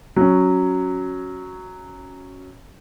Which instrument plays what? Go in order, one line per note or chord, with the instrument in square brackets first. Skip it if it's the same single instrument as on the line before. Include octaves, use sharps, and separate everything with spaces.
[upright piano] F#3 C#4